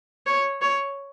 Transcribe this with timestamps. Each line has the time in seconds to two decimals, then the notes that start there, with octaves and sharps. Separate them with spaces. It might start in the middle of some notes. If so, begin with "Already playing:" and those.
0.26 C#5
0.61 C#5